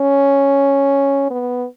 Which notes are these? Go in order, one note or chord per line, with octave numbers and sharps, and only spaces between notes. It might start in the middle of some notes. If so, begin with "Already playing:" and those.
Already playing: C#4
B3